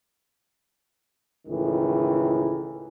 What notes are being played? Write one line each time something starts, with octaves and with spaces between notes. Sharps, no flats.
C#2 A2 D#3 E3